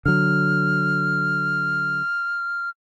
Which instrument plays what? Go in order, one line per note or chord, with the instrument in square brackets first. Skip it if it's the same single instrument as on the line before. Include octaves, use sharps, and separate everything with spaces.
[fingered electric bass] D3 F#3 [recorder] F6